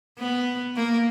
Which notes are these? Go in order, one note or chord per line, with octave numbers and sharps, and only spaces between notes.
B3
A#3